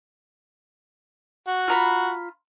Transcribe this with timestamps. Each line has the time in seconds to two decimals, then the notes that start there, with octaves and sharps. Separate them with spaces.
1.48 F#4
1.68 F4 A#5 B5